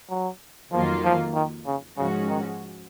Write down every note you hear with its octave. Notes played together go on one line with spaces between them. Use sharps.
F#3
F2 D#3 F3 F#3 A#3 F4
F3
D#3
C#3
G#2 C#3 F3 G#3 C#4 F#4
D#3